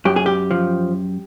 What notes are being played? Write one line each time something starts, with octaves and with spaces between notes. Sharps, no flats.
F#2 G4
G#4
G4
F3